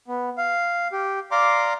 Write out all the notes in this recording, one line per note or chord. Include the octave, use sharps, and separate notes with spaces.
B3
F5
G4
D5 F5 A#5 C6 D6